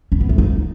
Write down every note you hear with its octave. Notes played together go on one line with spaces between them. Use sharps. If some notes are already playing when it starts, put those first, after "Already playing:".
C#4
B3
A3
D#4